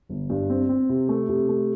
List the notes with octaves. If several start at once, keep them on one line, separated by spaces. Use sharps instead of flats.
G1
G2
C4
C4
C3
A3
C3
A3